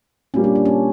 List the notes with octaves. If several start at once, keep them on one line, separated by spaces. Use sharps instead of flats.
A#2 G3 A#3 C#4
D4
D4
C#4